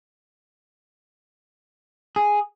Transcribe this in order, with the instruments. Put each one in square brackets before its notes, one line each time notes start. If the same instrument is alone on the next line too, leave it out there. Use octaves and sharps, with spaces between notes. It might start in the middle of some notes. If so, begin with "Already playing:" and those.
[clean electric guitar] G#4